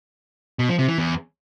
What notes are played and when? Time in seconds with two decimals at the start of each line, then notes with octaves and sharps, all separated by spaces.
0.59 B2
0.69 F3
0.79 C3
0.88 E3
0.98 E2